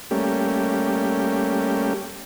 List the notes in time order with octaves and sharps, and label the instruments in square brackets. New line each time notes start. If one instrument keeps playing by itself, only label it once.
[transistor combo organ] G3 A3 A#3 C#4 G4